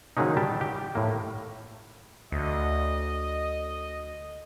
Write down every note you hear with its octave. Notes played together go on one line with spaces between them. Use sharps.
D#3 F#3 G#3 A#3 C#4 D#4
G3 G4 A5
G4
A2 A#3
D2 D#5